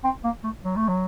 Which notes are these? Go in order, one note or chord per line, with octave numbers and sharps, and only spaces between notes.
C4
A#3
A3
F#3
A3
F#3